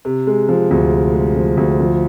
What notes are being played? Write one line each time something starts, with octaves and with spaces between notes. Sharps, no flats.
C3
G#3
F3
D2
C3
G#3
F3
D2
F3